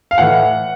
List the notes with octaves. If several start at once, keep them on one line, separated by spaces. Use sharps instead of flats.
F5
A2 E3 F#5